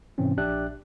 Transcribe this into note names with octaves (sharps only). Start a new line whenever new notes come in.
G#2 C3 E3 C4 C#4
A#1 D4 G4 D5 E5 F#6